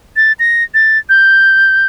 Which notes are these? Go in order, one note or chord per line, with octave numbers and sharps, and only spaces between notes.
A6
A#6
A6
G6